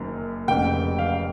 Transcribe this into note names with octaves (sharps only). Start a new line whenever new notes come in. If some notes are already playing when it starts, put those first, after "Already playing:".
Already playing: F#1 F#2 D#3
F1 F2 C#3 G5
F5